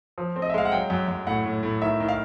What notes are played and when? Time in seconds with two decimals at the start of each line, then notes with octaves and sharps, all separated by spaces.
0.18 F3
0.36 C4
0.42 D#5
0.50 E5
0.54 G#3 F5
0.65 F#5
0.72 F#3 G5
0.90 F#2
1.08 F#2
1.27 A2 F#5
1.45 A2
1.63 A2
1.82 D#3 E5
2.00 D#3
2.08 F5